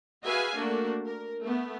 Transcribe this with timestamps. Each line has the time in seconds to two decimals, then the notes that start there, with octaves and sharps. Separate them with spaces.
0.23 F#4 G#4 B4 E5 F5 G#5
0.55 A3 A#3 D4 F#4
1.05 A#4
1.42 A3 B3